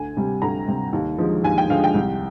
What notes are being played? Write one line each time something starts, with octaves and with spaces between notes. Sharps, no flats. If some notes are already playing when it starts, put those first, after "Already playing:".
Already playing: D2 G#5
C3 G3
D2 A#5
C3 G3
D#2
D3 F3 G#3
D#2 G#5
G5
D3 F3 G#3 F5
G5
C2